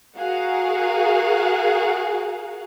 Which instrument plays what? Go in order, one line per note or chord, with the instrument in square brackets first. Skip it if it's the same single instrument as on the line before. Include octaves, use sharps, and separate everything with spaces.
[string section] F#4 G#4 A#4 F5 F#5